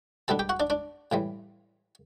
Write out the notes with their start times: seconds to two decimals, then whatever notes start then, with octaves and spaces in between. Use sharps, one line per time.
0.28 B2 G3 B3 D4 A4 A5
0.39 G4 G5
0.49 F#4 F#5
0.60 D4 D5
0.70 D4 D5
1.12 A2 E3 G3